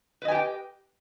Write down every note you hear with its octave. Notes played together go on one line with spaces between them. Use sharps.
G4 B4 D#5 G5 G#5